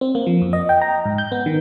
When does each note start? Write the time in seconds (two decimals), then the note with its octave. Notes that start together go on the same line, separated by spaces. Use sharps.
0.01 C4
0.15 A#3
0.27 F3
0.42 F2
0.53 D#5
0.69 G5
0.82 A#5
1.05 G#2
1.18 G6
1.32 B3
1.46 D#3